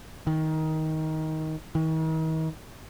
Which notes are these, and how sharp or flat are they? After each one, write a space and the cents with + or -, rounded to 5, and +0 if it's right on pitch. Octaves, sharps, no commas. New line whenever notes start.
D#3 +15
D#3 +40